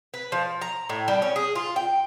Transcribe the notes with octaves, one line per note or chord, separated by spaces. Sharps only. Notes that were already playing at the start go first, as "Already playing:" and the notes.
B4
F3
A#5
A2
G3
C#4
G#4
F4
G5